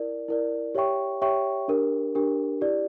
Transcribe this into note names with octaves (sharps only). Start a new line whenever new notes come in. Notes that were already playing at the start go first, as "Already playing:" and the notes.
Already playing: E4 A#4 D5
E4 A#4 D5
G4 C#5 E5 G5 C#6
G4 C#5 E5 G5 C#6
D4 G4 A#4
D4 G4 A#4
E4 G4 D5